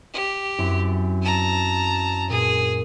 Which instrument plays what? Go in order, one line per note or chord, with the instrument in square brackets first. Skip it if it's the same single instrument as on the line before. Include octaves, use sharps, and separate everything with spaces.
[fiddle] G4
[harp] F#2 C4 E4
[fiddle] A5 A#5
[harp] A#2 [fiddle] G#4